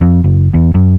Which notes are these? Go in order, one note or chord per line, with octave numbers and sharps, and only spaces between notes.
F2
F#1
E2
F#2